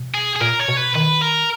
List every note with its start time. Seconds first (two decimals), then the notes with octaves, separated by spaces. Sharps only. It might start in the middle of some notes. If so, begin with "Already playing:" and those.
Already playing: B2
0.14 G#4
0.36 G#4
0.40 A#2 A#4
0.60 C#5
0.68 B2
0.77 B4
0.95 D#3 B4
1.22 A#4